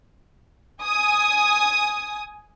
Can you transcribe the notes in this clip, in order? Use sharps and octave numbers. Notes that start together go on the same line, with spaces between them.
G#5 D#6